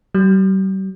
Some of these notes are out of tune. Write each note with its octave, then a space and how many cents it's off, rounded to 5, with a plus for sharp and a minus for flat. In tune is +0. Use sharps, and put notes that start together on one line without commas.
G3 -40